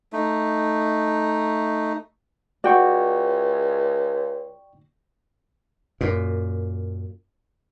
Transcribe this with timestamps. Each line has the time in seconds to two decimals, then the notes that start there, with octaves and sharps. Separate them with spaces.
0.13 A3 D#4
2.64 C#2 F#4 D5 G5 C#6
6.01 F#2 A#2